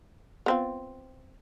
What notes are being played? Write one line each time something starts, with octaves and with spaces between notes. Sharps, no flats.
B3 C4 F4